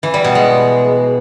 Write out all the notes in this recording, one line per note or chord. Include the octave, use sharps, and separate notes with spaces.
E3
G3
B2
G#3